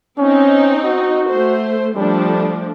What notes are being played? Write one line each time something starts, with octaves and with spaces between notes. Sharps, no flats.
C4 C#4 D#4
F#4
A3 C5
F3 G3 A3 D4